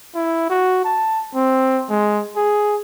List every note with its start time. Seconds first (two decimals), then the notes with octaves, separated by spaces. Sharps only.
0.15 E4
0.50 F#4
0.85 A5
1.35 C4
1.89 G#3
2.36 G#4